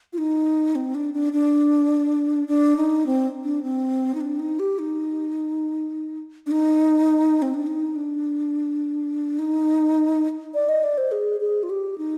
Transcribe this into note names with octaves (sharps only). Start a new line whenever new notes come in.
F4
D#4
C4
D4
D4
D4
D4
D#4
C4
D4
C4
D#4
D4
D#4
G4
D#4
D4
D#4
C4
D4
D#4
D4
D#4
D5
D#5
D5
C5
G#4
G#4
F4
G4
D#4